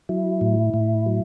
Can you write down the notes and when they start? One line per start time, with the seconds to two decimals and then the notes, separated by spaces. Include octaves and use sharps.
0.09 F#3 E4
0.41 A2
0.74 A2
1.06 F#3